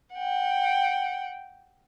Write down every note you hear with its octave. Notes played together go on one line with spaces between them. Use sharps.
F#5 G5